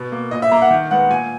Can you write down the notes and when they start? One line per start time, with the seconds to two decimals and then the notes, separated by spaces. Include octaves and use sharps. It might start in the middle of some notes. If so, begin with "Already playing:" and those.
Already playing: B2
0.12 A#3
0.31 A#2 D#5
0.42 E5
0.52 A#3 A#5
0.62 F#5
0.70 D#3
0.91 G#3 B3 F#5
1.10 A#2 G#5